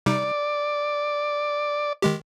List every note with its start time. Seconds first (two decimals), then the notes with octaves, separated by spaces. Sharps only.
0.06 C3 G3 D#4 D5
2.02 D#3 G#3 G4